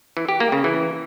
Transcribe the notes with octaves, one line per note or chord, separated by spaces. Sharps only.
E3
G4
A#3
C#3
E3